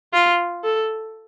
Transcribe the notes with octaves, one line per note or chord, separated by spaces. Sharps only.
F4
A4